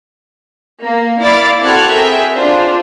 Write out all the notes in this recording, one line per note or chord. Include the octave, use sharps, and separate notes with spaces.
A#3
E4 D5 F5 D6 A6
C4 F#4 A4 F6 F#6 G#6
G#4 A#4 E5 G5
D4 F4 C5